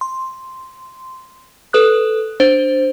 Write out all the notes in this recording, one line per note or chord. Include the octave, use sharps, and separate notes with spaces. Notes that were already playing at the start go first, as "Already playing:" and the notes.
C6
A4 B4 D#6 F#6
D4 C5